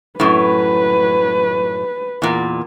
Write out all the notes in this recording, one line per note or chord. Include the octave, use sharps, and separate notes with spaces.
F#2 A2 B4
E2 A#2